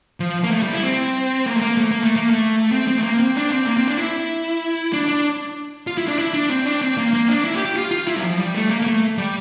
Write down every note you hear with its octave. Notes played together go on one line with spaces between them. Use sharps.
F3
A#3
A3
G3
E4
C4
A#3
A3
A#3
A3
A#3
A3
A#3
A3
C4
C4
A3
A#3
C4
D4
C4
A#3
C4
D4
E4
D4
D4
F4
E4
D4
E4
D4
C4
D4
C4
A#3
A#3
D4
E4
G4
G4
F4
F4
E4
G3
F3
G3
A3
A#3
A#3
A3
G3